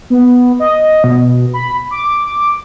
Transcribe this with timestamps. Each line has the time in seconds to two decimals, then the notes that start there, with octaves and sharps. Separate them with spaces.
0.10 B3
0.60 D#5
1.04 B2
1.54 B5
1.91 D6